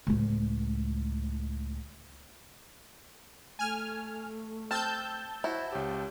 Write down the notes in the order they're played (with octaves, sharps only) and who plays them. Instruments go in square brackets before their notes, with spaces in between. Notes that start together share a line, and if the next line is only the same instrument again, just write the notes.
[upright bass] C#2 A2
[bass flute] A3 [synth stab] G#5 F6
[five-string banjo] C4 [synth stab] A5 E6 G6 [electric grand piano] F6
[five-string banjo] E4 F#4 [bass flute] C5
[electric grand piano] C#2 G4 [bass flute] C#5